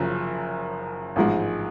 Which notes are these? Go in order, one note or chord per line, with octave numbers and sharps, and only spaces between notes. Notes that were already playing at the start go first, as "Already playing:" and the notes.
Already playing: F#1 F#2 C#3 F3
A1 G#2 F3 G#3